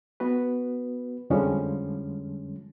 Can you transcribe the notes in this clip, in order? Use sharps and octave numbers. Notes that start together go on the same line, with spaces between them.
B3 F#4 B4
F2 D3 F3 G3 G#3 C#4